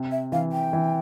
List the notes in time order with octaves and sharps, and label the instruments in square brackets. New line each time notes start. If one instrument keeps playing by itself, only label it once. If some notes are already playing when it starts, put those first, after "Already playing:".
Already playing: [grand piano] C3
[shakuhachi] E5
[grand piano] E3 [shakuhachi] F5
[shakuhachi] G5
[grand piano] E3